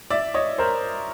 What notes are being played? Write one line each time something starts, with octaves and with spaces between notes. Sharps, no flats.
D5 E5
C#5 D#5
A#4 C5